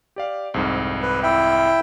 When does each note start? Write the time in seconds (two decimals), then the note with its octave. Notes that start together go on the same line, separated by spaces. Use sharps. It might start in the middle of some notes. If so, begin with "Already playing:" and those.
0.16 G4 D5 F5
0.54 C2 F2 G#2
1.02 B4
1.23 E4 E5 G5